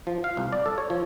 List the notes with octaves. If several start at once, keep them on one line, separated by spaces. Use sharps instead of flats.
F3
F5
C2
D5
A4
C#5
F3